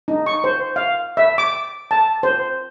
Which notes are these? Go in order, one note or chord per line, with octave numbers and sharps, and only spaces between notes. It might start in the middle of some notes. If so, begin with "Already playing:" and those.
D#4
C#6
C5
F5
E5
D6
A5
C5